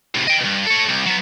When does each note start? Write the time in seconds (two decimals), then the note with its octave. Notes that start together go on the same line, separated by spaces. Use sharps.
0.14 A2 C3
0.27 D#5 G5
0.41 G2 B2
0.66 A4 C#5
0.89 C2
1.07 F#3 B3